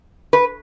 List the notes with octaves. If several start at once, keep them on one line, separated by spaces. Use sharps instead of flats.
B4